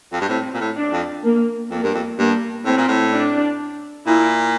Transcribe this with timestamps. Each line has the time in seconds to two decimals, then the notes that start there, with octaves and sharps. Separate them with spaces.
0.13 F2
0.21 G2
0.28 A2 C4
0.54 A#2
0.60 A2
0.76 D4
0.92 F2
1.24 A#3
1.71 F2 A#3
1.83 G2
1.94 F2
2.18 G2 A#3
2.65 A2 C4
2.77 A#2
2.88 A2
3.13 D4
4.07 A#2 E4